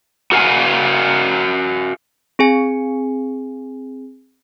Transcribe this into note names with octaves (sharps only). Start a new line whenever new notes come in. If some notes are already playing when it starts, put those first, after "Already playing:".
F#4 A#4 F5 F#5 G#5
C4 G#4 G#5